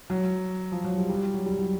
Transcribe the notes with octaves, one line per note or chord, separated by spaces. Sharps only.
F#3
F3
F#3
G3
G3
F#3
G3
F#3